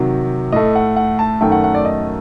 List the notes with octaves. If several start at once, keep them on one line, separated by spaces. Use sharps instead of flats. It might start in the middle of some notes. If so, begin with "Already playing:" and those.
Already playing: C3 D#3 F#3
A2 A3 D#5
F#5
F#5
A5
F#2 D#3 F#3 A3 G5
F#5
F#5
D5
D#5